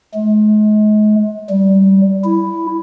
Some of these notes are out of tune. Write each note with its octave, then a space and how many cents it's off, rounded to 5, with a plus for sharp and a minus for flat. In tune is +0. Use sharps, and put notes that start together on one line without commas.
G#3 +40
G3 -20
E4 +0